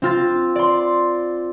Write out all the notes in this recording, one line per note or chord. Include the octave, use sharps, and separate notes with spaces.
C4 F4 A6
D5 C6